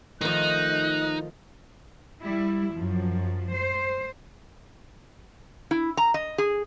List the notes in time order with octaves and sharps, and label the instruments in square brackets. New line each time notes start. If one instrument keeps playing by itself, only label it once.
[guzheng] D#3 F3 [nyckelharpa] A3 D#5 [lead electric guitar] D#4 [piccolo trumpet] F#6
[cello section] G3 E4
F#2 F3
C5
[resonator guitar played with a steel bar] E4
A#5
D#5
G#4